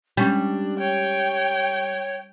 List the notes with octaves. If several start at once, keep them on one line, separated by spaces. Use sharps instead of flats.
G3 G#3 C#4 D4
C#5 G5